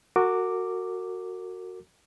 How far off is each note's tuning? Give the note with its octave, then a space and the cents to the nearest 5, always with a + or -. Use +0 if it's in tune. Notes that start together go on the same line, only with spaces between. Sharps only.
F#4 -5 A#4 -35 D6 +0